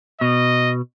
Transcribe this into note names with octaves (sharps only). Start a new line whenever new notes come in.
B2 D#5